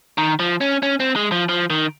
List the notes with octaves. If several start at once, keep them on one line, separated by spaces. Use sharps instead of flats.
D#3
F3
C#4
C#4
C4
G#3
F3
F3
D#3